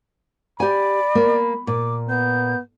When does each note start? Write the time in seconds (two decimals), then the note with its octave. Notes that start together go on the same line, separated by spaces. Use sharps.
0.60 G4 D5 G#5 B5
1.15 A#3
1.67 A#2 D6
2.09 B3 G6